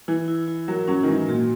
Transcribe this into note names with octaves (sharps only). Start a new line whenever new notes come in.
E3 E4
E4
E4
F#3 A#4
F#3 C#4
D#3
E3 G#3
A#2 F#4